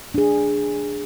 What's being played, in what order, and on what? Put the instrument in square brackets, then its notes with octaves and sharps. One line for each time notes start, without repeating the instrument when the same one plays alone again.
[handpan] D4 G#4